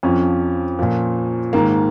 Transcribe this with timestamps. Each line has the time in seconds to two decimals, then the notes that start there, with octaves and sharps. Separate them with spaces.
0.03 F2 F3 C#4
0.79 A#2 F3
1.53 G#2 D#3 A#3